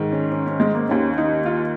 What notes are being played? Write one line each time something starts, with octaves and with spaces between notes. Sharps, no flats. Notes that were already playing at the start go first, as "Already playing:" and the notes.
Already playing: G#2 D#3
C#4
C#4
C#4
G#3
A#3
D#2 D#3 C#4
D#4
F4